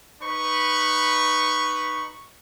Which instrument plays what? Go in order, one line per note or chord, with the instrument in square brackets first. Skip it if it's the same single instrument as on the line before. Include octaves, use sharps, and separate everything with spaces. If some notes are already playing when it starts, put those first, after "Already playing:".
[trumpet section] D#4 B4 B5 C#6